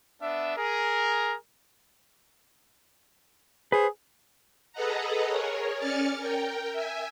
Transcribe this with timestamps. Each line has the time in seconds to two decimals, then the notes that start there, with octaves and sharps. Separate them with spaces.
0.21 B3 D4 E5
0.56 G#4 A#4
3.72 G#4 B4 C5
4.73 G#4 A4 B4 D#5 F#5 A#5
5.29 G#4 A#4 C#5
5.78 C#4 D5 G#5 F6 A6 C#7
6.17 A#4 G5
6.72 E5 G#5